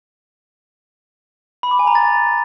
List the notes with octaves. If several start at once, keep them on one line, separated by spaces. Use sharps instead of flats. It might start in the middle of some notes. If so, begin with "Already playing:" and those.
B5
D6
G#5
A#5
A6